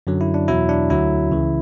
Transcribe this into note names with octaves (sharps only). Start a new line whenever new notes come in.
F#2 D3 F#3
E4
D4
E2 B2 F#3 E4
D4
D2 D3 F#3 E4
C#2 C#3 E3